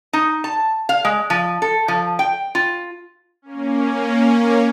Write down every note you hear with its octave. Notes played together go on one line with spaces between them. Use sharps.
D#4
A5
F5
G#3
F3
A4
F3
G5
F4
A#3 C#4